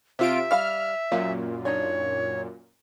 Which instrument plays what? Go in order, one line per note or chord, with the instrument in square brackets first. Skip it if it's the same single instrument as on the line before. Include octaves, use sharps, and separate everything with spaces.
[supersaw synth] C3 F4 D7 [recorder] E5
[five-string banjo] G3 F5 B5 [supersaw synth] F6
[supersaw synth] F#2 A#2 [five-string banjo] F5
[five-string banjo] D4 D#4 [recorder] C#5